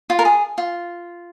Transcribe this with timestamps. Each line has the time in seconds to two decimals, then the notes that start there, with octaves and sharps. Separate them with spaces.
0.10 F4
0.19 A#4
0.25 G#4
0.58 F4